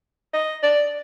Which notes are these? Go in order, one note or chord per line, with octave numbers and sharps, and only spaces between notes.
D#5
D5